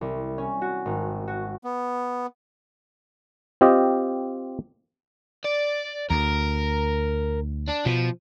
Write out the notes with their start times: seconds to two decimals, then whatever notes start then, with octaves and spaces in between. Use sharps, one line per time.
0.01 C2
0.38 C#4
0.62 F#4
0.86 G#1
1.28 F#4
1.64 B3
3.61 C4 F4 G4 D#5
5.45 D5
6.10 D2 A#4
7.69 D4
7.86 B2 F3